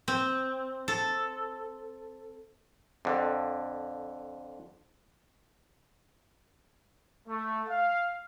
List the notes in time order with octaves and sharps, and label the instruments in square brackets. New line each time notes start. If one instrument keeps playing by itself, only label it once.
[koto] C4
A4
[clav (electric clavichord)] F2 D3
[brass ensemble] A3
F5